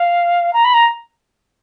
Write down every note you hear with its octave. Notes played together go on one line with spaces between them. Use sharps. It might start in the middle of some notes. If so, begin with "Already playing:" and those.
Already playing: F5
A#5
B5
A#5